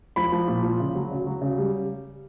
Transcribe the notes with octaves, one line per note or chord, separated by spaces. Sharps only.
F3 B5
F3
A#2
F3
C#3
F#3
C#3
F#3
C#3
G3